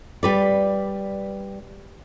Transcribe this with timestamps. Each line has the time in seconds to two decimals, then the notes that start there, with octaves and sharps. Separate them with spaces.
0.23 G3 B4 D5